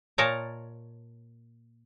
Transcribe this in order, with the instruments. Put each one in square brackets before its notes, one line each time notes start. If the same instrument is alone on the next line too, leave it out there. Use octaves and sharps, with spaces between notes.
[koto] A#2 A#4 C#5 D#5 A5 A#5